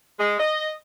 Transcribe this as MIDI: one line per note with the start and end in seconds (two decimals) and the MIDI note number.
0.19 0.35 56
0.39 0.71 75